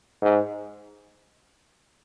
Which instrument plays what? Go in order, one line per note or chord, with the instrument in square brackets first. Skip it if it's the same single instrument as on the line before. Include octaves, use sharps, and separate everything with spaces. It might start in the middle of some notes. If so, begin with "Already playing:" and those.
[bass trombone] G#2